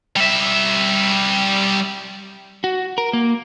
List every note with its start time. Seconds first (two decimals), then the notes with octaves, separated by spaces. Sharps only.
0.17 G3 E5
2.64 F#4
2.98 A#4
3.13 A#3